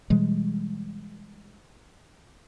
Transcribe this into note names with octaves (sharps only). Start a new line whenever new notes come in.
B2 E3 G3 G#3